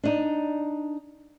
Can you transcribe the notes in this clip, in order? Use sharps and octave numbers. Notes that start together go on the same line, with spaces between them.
D4 D#4